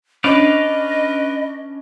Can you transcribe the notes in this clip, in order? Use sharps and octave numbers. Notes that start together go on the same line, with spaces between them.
C#4 D4 B4 D5 D#5 F5